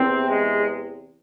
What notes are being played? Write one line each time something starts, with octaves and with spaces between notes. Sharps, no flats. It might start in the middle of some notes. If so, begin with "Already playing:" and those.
Already playing: E2 C3 E3 C4
G#3